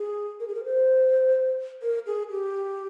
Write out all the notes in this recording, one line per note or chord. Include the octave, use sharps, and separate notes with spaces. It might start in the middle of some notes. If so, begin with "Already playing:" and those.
Already playing: G#4
A#4
G#4
A#4
C5
A#4
G#4
G4